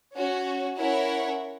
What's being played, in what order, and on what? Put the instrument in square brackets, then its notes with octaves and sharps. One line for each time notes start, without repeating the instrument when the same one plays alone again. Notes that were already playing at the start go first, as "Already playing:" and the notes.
[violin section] C#4 F#4 C#5
C#4 E4 A#4 C#5 F#5